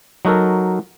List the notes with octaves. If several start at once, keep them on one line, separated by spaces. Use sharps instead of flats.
F#3 D#4 F#4 A4 A#4